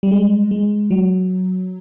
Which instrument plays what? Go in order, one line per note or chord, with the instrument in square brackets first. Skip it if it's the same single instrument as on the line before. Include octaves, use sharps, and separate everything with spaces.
[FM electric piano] G3
G#3
G#3
F#3